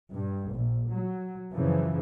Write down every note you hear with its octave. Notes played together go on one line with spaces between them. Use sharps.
G2
A#1
F#3
F#2 C#3 E3 F3